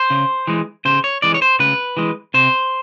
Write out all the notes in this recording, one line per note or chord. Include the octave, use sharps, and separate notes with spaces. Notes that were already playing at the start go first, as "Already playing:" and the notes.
Already playing: C5
C#3
E3 G#3
C#3 C5
C#5
E3 G#3 D5
C#5
C5
C#3 B4
E3 G#3
C3 C5